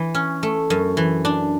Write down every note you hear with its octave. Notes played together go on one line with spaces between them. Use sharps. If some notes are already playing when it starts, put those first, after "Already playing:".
Already playing: E3
C#4
A3
F#2
E3
D4